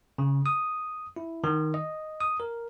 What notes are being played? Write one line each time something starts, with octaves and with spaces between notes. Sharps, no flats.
C#3
D#6
E4
D#3
D#5
D#6
A#4